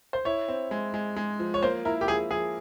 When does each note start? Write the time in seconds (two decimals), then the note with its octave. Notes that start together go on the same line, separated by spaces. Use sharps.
0.13 C5
0.25 E4 C#5
0.48 C4
0.71 G#3
0.94 G#3
1.16 G#3
1.39 F3
1.54 C#5
1.63 A#3 C5
1.85 E4 A#4
2.01 G4
2.08 F3 G#4
2.31 F3 G#4